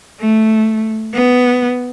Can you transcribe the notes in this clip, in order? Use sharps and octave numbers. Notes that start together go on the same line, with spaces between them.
A3
B3